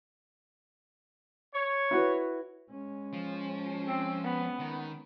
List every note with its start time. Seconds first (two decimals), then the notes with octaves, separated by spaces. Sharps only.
1.54 C#5
1.91 E4 F#4 B4
2.70 G#3 C#4
3.13 F3
3.87 C4
4.24 B3
4.60 D#3